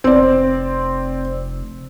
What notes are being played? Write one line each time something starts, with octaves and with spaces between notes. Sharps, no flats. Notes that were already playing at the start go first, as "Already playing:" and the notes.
F1 C4 D5